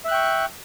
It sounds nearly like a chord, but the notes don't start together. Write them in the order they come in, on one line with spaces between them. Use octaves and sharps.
E5 F#6 G5 C#6